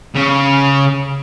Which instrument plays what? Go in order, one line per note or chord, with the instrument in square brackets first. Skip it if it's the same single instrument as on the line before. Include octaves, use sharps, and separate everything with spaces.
[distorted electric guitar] C#3